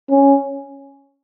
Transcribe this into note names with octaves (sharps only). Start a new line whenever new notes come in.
C#4